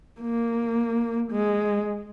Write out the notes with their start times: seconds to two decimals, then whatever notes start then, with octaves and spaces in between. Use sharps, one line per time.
0.21 A#3
1.32 G#3